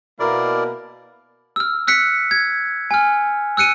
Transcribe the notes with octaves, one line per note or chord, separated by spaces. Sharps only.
B2 A#3 E4 A#4 D5
E6 F6
E6 F#6 B6 C#7
G#6
G#5 F6
E6 F#6 C#7 D#7